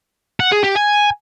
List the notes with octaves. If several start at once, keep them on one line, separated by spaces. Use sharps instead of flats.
F#5
G#4
G4
G#5